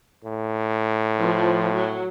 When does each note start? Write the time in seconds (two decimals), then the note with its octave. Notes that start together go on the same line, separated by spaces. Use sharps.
0.24 A2
1.20 F3
1.76 F#3